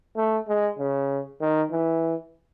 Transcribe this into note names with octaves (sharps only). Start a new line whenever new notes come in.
A3
G#3
C#3
D#3
E3